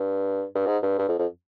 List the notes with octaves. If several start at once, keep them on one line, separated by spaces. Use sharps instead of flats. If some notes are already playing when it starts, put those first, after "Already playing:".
Already playing: G2
G2
G#2
G2
G2
F2
F2